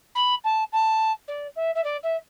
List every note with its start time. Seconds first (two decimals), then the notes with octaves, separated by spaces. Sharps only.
0.15 B5
0.44 A5
0.72 A5
1.27 D5
1.56 E5
1.75 E5
1.84 D5
2.03 E5